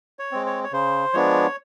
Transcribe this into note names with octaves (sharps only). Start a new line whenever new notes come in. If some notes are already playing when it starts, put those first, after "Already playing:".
C#5
G#3 C4
C#5
C#5
C#3 C5
F3 G#3 B3 D4 C#5